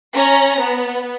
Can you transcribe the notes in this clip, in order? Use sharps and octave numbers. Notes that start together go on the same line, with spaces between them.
C#4 A#5
B3